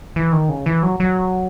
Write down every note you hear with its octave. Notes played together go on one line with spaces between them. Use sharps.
E3
D#3
C#3
E3
F#3
F#3